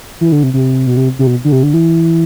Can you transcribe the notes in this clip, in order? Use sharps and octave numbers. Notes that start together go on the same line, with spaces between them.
E3
D3
C3
C3
B2
C3
C3
B2
D3
C3
D3
E3